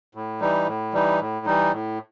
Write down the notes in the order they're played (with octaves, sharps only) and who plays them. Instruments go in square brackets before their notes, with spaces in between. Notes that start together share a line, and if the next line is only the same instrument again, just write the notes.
[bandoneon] A2
E3 G3 D#4
A2
E3 G3 D#4
A2
E3 G3 D#4
A2